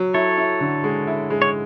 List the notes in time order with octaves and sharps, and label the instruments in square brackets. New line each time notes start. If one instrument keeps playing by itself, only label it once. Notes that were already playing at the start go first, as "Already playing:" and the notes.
Already playing: [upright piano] F#3
[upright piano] E4 [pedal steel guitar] A4 C#5
[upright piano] E4
D3
G#3
E4
G#3
[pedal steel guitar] C#5